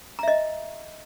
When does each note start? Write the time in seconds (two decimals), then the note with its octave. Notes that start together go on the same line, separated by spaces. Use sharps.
0.19 A#5
0.23 E5
0.28 D#5